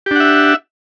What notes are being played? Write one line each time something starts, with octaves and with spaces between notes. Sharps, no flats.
D4 G4 E5 F#5